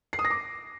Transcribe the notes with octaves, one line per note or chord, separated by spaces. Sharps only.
C7
D#6
A#6
D6